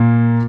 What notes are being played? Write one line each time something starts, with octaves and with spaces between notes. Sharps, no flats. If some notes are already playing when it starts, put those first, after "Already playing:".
Already playing: A#2 A#3